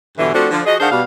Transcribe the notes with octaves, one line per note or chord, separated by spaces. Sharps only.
G2 B2 D3 E3
F3 A3 C4 D4 F#4
D3 F3 D4
F3 F#4 G#4 D#5
D#3 D4 G#4 C5 F5 F#5
B2 G3 F5